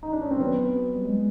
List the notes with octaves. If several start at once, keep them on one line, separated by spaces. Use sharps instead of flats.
D#4
D4
C#4
C4
F#3 B3
G3
G#3